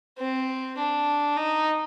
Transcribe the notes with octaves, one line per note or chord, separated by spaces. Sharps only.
C4
D4
D#4